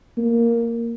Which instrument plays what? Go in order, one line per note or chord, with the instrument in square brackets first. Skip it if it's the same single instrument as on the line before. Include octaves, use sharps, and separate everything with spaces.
[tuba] A#3